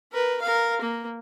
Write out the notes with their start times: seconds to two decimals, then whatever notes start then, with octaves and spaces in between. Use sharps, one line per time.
0.12 A#4 B4
0.42 A#4 F5
0.82 A#3